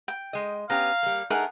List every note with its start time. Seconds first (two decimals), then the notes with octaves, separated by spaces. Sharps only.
0.08 G5
0.33 G#3 D#5
0.70 B3 C#4 G4 F5 A#5
1.03 G3 A#3
1.30 A3 D#4 G#4 A#4 F#5